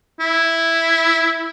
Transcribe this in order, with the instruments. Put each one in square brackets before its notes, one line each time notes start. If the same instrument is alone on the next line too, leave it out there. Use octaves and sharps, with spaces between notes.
[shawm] E4